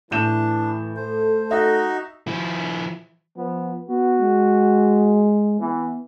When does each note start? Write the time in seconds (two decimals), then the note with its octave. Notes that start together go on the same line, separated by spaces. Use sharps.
0.11 A2 E3 D4 G6 E7
0.96 A3 A4 C5
1.51 D#4 F#4 D#5 E5
2.27 F3 E4
3.37 F3 B3
3.89 B3 F#4
4.20 G#3
5.60 E3 B3